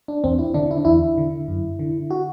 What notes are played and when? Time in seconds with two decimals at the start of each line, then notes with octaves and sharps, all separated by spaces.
0.08 D4
0.24 E2 C4
0.39 E4
0.54 D3 D4
0.71 E4
0.78 D4
0.85 E2 E4
1.18 D3
1.48 F#2
1.79 D3
2.11 F#4